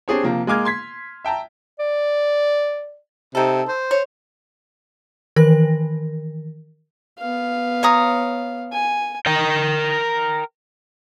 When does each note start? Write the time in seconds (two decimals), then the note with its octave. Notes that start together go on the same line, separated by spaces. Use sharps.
0.08 C4 D4 G4 G#4 C5 C#5
0.23 C3 F3 A#3
0.47 G#3 A#3 G#5 D6 F6 G#6
0.65 C6 G#6 B6
1.25 E5 G5 A5 A#5
1.79 D5
3.35 C3 D#4 A4
3.68 C5
3.91 C#5
5.36 D#3 E3 A#4 A#6
7.18 B3 F5
7.83 C#5 A#5 D#6
8.72 G#5
9.27 A#4 G5